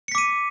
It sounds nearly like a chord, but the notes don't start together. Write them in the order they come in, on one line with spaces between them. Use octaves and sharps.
C#7 B6 D6 D#7